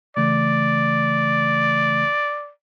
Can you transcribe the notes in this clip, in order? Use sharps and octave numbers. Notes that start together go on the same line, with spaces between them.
C#3 E3 A3 D5